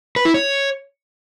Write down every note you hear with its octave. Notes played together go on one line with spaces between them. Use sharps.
B4
E4
C#5